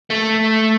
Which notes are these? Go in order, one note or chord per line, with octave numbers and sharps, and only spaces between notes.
A3